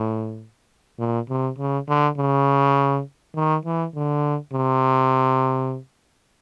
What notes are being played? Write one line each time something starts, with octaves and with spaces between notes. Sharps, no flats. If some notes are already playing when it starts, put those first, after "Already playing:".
Already playing: A2
A#2
C3
C#3
D3
C#3
D#3
E3
D3
C3